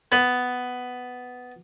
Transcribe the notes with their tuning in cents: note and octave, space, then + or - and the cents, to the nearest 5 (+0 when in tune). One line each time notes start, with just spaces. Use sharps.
B3 +10